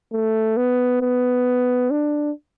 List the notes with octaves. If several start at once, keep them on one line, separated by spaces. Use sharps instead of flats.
A3
B3
B3
D4